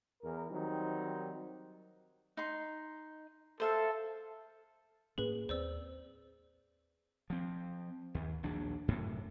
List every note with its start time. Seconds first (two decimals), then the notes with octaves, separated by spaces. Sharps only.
0.22 E2 E3 A#4
0.51 D#3 F#3 G3 C4 D#4
2.37 D#4 C6
3.60 A4 C5 E5 F5
5.18 A2 A#3 C#4 G#4 B4
5.49 D#2 G3 C4 C5 D5 E6
7.30 F3 C4
8.15 D#2
8.43 A#1 D#2 F#3 D4
8.88 F#2 A2 C3